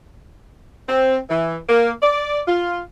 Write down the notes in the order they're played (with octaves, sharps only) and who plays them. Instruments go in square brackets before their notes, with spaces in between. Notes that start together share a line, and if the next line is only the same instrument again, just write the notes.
[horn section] C4
E3
A#3
D5
F4